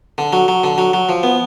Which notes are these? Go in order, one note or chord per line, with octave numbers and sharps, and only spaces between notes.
D3
F#3
F#3
D3
F#3
F#3
F3
B3